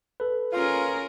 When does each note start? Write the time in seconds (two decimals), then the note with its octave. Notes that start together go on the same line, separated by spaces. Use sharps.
0.20 A4 B4
0.53 C#4 F4 G#4 A#4